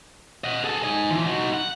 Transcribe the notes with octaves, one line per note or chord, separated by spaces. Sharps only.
D#5 F#5
G#4 A4
D#4 G#5
E3 F3
D#4 F#4
F#5